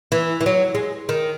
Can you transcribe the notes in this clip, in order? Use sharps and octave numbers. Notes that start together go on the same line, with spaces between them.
E3
E3
F#3
G#3
D#3